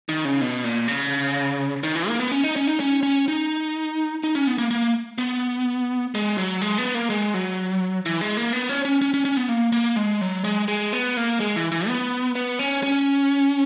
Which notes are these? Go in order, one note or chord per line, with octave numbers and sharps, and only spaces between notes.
D#3
C#3
B2
A#2
C#3
D#3
E3
A#3
B3
C#4
D#4
C#4
D#4
C#4
C#4
D#4
D#4
C#4
B3
A#3
A#3
B3
G#3
F#3
G#3
B3
A#3
G#3
F#3
E3
G#3
A#3
B3
C#4
C#4
C#4
C#4
C#4
B3
A#3
A#3
G#3
F#3
G#3
G#3
B3
A#3
G#3
E3
E3
B3
B3
C#4
C#4